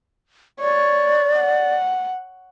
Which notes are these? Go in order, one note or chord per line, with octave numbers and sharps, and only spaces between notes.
C#5 D5
F#5